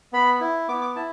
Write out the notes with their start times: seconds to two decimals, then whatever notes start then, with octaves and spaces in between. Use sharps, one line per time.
0.13 B3 B5
0.40 E4
0.68 B3 D6
0.81 D6
0.96 E4 A5